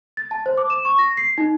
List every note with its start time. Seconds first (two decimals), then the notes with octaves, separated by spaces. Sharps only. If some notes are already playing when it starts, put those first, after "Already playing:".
0.17 A6
0.31 A5
0.46 C5
0.57 D6
0.70 E7
0.85 C#6
0.99 A#6
1.17 C7
1.38 D#4